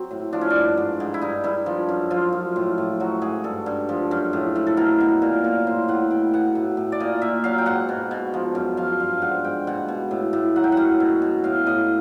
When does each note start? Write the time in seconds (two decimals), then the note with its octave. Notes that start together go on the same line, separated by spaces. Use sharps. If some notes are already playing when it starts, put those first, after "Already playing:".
Already playing: F#3 C4
0.11 A2
0.33 F3 D4
0.41 C#4
0.50 D4
0.56 G2
0.77 G#2
1.00 G#2
1.14 E4
1.22 G2 D#4
1.44 G2 E4
1.66 F3
1.89 F#2
2.11 F3 F4
2.33 F#2
2.56 A2
2.78 A2
3.00 F#3 F#4
3.22 G#2 G#4
3.44 G2 A4
3.66 G2
3.89 F3
4.11 F#2
4.33 A2
4.56 A2
4.67 A4
4.77 B2 A#4
5.00 B2
5.22 A#2
5.44 A#2
5.67 A2 C5
5.88 A2 F#5
6.10 B2 G5
6.34 B2 F#5
6.55 A2
6.77 A2
6.92 D5
7.00 A#2 D#5
7.22 A#2 E5
7.44 F#3 F5
7.58 G5
7.66 G#2 F#5
7.89 B2
8.11 B2
8.34 F3
8.55 F#2
8.77 F3 F5
9.00 G2 F5
9.22 G#2 F#5
9.44 G#2 G5
9.67 B2 F#5
9.88 B2
10.11 A2
10.33 A2
10.56 F#3 F#5
10.64 G5
10.72 F#2 F#5
11.00 B2
11.22 B2
11.44 A2 F5
11.66 A2 D#5